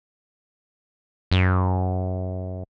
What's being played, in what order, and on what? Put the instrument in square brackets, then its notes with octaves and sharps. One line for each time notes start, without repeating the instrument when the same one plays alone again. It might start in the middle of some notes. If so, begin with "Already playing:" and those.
[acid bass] F#2